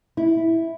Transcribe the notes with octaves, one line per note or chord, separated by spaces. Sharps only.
E4